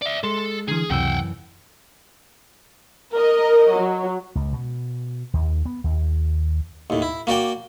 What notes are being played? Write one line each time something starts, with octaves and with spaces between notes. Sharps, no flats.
D5 E5
G#3 A4 C6
D3 E3 G#4
C#2 F#2 C3 E3 F#5 G5 E6
A#4 D#5
F#3
C#2
B2
D#2
B3
D#2
D#2 A2
E4
A#3 F#4 D5 G5